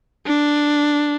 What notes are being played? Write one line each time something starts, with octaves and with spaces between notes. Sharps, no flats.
D4